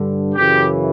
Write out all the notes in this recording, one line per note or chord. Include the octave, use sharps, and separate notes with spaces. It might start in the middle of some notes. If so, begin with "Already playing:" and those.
Already playing: G2 D3
F#2 C#3 E3 G4